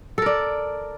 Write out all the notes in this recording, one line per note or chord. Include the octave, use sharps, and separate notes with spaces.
A4 A#4 D5